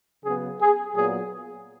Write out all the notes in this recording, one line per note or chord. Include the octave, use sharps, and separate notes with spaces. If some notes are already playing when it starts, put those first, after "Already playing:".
C#3 F#3 B3 G#4
G#4
A#2 F#3 B3 G#4